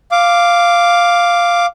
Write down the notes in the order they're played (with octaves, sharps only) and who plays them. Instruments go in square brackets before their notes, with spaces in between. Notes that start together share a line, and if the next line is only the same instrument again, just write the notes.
[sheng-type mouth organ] F5 D6